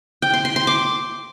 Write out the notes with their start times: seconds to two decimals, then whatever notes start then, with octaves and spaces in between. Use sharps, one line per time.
0.22 G5
0.34 C6
0.45 C6
0.56 C6
0.67 D6